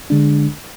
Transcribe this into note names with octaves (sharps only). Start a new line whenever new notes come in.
D3 G#3 D4